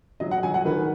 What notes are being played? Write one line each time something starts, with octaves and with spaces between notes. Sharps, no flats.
F#3 D#5
F#5
F#3 G#5
F#5
D#3 B4